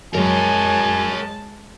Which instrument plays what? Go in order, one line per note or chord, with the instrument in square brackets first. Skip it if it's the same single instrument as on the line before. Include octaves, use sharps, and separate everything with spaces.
[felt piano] F#2 [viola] G#3 A5 [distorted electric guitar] A#4 C#5 [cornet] G#5